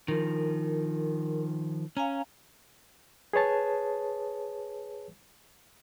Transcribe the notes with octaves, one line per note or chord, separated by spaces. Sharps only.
D#3 F3 A#4
C#4 F5 G#5 A#5
G#4 B4 C#5 A5